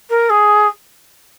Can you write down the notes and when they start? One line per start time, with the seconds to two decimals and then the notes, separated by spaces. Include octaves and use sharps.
0.10 A#4
0.29 G#4